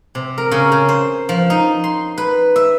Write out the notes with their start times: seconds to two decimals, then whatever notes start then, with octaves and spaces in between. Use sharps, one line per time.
0.15 C3
0.38 A#4
0.51 C#3
0.72 C#3
0.89 C5
1.29 F3
1.50 D#4
1.84 C6
2.18 B4
2.56 E5